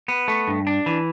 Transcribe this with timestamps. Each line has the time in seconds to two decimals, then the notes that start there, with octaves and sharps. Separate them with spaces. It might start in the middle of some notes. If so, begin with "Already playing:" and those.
0.08 B3
0.28 A3
0.48 G2
0.67 D4
0.86 E3